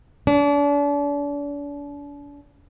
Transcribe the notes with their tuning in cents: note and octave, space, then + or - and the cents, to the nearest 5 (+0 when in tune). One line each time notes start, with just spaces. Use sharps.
D4 -40